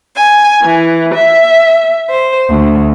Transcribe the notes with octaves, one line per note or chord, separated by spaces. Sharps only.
G#5
E3
E5
C5
D2